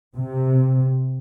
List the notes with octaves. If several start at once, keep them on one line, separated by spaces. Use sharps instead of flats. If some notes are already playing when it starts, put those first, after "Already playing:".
C3